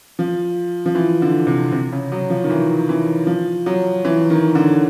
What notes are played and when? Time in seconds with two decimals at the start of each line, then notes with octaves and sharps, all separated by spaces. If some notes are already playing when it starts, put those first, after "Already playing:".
0.19 F3
0.86 F3
0.95 E3
1.22 D3
1.47 C3
1.72 C3
1.92 C#3
2.12 F#3
2.30 F3
2.44 D#3
2.50 E3
2.89 E3
3.27 F3
3.66 F#3
4.05 E3
4.30 D#3
4.55 D3